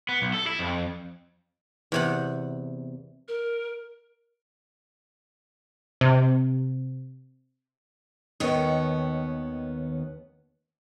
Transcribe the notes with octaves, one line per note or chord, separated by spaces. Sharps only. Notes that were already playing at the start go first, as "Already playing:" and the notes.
B3
B1
A4
E4
F2
E2 C3 F#5
A#4
C3
D#2 D#3 B3 C#5